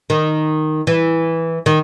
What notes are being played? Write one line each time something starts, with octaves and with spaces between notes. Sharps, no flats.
D#3
E3
D#3